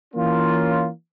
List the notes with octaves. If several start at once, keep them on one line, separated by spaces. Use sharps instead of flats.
E3 A#3 C#4 F4